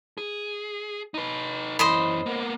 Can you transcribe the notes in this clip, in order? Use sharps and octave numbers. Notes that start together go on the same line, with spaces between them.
G#4
D#4 B4
F#2 E3 C5 D#5 B5
A#3 B3